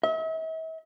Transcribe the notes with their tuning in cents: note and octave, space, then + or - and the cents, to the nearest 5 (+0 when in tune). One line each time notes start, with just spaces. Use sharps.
E5 -45